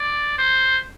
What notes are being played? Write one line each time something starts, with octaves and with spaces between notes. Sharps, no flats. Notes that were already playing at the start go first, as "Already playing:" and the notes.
Already playing: D5
C5